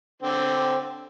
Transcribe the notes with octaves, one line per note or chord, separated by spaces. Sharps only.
D3 C4